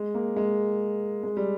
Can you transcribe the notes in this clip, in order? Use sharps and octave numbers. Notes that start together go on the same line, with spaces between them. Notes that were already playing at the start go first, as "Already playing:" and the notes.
Already playing: G#3
A#3
G#3
G#3
G3